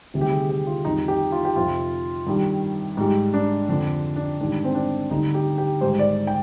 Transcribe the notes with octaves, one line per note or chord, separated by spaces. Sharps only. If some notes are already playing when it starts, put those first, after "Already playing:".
D2 C3 D#3 G3
G4
G#4
G4
F4
F2 D#3 G3 D#4
G4
F4
G4
F2 C3 F3 F4
G2 D#3 G3
G#2 G3
D4
F2 D3 F3 D4
D4
G#2 D#3 G3 D4
C4
D4
D2 D3 G3 D#4
G4
G4
G#2 D#3 G3 C5
D5
G5